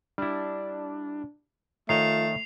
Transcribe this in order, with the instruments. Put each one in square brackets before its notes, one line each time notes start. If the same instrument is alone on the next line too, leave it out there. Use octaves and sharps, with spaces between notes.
[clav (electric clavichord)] G3 E4 [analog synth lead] D4
[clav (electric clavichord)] D#3 C#5 D#5 [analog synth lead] F3 [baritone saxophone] A3 [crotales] C7 F7